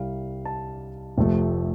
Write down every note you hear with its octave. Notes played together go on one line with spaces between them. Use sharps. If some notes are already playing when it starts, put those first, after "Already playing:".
Already playing: C2 C3 G3 F5
A5
F1 F2 C3 F3 A3